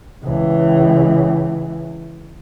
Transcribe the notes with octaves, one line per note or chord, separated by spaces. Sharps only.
C#2 E3